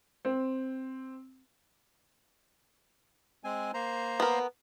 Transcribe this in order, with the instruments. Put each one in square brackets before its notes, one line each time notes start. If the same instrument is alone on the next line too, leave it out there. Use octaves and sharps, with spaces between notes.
[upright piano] C4
[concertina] G#3 C4 G#5
A#3 C5 A#5
[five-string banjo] B3 A#4